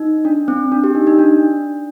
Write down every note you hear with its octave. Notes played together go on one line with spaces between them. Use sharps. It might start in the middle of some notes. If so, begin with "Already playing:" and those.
Already playing: D#4
D4
C4
D4
G4
D#4
D#4
D4